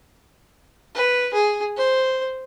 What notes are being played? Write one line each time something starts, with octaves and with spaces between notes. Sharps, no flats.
B4
G#4
C5